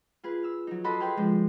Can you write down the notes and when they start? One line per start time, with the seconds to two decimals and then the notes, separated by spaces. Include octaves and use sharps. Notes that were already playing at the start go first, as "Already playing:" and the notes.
0.24 F4 G#4 B4
0.43 E6 F6
0.67 F#3 D#4
0.84 F#4 A4 D#5 A5 B5 C6
1.00 G4 G#4 B4 G5 C6
1.16 F3 G#3 D4